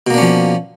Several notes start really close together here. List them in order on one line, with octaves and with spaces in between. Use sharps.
B2 A#3 D4 C#4 F3